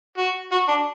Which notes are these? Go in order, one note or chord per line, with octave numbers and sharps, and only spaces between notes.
F#4
F#4
D4